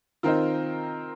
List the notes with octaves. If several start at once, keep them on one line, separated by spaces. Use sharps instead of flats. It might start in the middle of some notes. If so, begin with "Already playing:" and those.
D#3 C4 D#4 F4 A#4